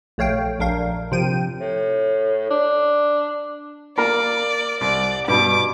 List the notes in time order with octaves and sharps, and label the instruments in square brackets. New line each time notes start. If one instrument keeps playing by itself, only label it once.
[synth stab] A#1 A3 C#5 F5 G5
A#1 D4 A#4 F5
C3 F3 G5 D#7
[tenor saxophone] A2
D4
[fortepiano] A#3 A#4 [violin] D5
[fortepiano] C2 [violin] D5
[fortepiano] G2 B2 [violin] D6